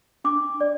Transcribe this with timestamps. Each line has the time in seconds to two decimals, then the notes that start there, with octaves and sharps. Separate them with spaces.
0.24 D4 D6
0.61 D5